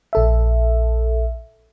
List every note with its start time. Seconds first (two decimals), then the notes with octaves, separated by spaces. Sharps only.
0.13 A#1 A4 E5